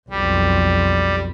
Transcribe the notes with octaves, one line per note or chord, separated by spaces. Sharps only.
B1 F2 G3